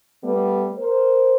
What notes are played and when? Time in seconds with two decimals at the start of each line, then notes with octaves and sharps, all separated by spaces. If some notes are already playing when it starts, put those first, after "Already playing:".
0.23 G3 A3 B3
0.78 A#4 C5